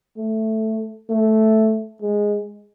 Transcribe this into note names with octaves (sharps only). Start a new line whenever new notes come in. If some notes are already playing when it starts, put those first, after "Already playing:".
A3
A3
G#3